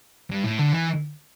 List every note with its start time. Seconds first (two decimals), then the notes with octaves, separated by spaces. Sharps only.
0.30 G2
0.44 A2
0.58 D3
0.73 E3